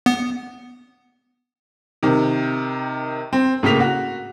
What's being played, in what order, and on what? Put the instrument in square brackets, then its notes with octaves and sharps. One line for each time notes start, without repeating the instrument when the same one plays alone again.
[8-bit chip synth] B3
[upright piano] C3 D#3
C4
A2 C#3 A#3 B6 F7
F#4